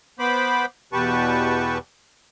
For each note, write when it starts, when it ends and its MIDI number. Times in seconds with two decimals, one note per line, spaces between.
0.19 0.66 59
0.19 0.66 72
0.19 0.66 83
0.19 0.66 86
0.93 1.78 40
0.93 1.78 47
0.93 1.78 67
0.93 1.78 71
0.93 1.78 81
0.93 1.78 85